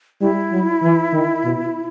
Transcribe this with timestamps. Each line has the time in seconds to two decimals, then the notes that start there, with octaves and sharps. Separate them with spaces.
0.21 G3 E4
0.52 F#3
0.83 E3
1.13 D#3
1.44 B2